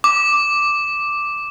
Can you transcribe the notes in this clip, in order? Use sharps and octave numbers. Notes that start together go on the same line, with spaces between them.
D6